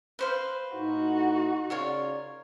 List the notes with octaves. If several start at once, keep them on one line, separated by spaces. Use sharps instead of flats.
B4 C5 F5
A2 D#4 F#4
C#3 F4 A#4 C#5 D5